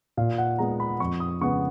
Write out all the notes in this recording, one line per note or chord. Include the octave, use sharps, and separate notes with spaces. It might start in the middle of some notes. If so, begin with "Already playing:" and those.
A#2 F5
F#5
G#3 B3 A#5
B5
F2 C#6
D#6
C#3 G#3 B3 C#6